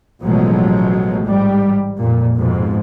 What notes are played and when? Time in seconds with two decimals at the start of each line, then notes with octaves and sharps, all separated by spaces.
0.23 A1 B2 F3 F#3 G#3 A3
1.26 G#2 G3
1.99 F2 A#2
2.37 F2 G#2 B2